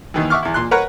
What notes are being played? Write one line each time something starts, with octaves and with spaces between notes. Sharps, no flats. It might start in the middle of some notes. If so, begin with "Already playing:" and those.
D#2 D#3 E3
E5 F#5 C#6 D6 F6
E2 E4
A#2 C6 F#6
A#4 B4 C#5 F#5 A#5